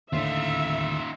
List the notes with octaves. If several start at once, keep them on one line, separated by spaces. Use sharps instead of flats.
D#2 A2 D3 D#4 F4 E5